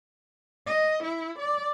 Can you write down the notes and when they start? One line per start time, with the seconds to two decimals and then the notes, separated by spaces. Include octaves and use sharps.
0.66 D#5
1.04 E4
1.39 D5